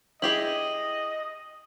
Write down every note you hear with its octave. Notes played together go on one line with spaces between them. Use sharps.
E4 G4 G#4 D#5 F#7